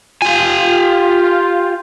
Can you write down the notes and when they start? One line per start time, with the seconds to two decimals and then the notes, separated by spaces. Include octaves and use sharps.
0.22 F4 G4 G#5